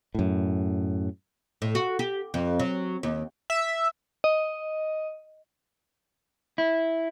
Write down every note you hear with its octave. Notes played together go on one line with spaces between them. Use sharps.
F#2 A2
A2
F#4
G4
F2
F#3
D#2
E5
D#5
E4